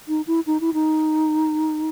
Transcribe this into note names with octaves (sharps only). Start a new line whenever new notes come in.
D#4
E4
D#4
E4
D#4